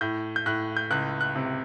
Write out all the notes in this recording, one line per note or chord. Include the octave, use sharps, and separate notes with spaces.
A2 G6
G6
A2 F#6
G6
C#2 F#6
F#6
C3